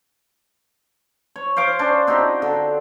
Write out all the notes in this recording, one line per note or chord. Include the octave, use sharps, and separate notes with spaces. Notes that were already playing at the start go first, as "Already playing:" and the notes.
C#5
C5 F5 D6
C#4 D4 C5
C4 D#4 F#4 G4
D3